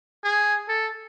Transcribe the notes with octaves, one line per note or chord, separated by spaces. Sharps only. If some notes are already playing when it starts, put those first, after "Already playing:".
G#4
A4